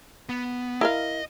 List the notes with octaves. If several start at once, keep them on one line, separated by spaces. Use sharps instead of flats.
B3
E4 A#4 D#5 F5